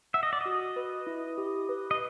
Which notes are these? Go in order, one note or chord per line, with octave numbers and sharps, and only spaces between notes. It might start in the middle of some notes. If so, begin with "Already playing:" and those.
E5 F#5
D#5
D5
F#4 D#5
B4
E4
G4
B4
D#5